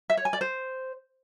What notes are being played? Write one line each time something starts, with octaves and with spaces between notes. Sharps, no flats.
E5
C#5
G#5
D5
C5